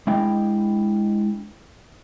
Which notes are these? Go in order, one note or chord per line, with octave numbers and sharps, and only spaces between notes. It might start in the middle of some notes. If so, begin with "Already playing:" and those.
G#3 D4 E4 D#5 F5 G5